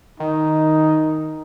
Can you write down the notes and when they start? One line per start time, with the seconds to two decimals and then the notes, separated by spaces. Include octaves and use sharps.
0.20 D#3 D#4